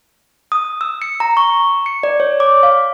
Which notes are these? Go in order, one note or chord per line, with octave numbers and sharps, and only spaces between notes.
D#6
E6
C#7
A#5
C#6
C#7
D5
C#5
D6
F5